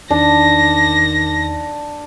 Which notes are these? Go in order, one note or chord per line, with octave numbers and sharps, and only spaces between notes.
E2 D#3 D4 A#6